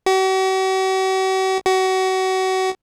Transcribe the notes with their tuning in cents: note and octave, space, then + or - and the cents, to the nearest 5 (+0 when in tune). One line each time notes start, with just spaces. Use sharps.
F#4 +45
F#4 +30